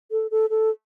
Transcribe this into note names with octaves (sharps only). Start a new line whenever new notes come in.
A4
A4
A4